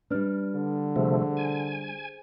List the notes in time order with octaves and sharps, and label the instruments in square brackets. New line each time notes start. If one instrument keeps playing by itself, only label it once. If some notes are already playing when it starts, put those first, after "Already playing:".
[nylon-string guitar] G3 D4 [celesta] B4 F6
[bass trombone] D3
[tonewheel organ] C3 F3 A3 [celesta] G#4 C5
[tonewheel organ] G#5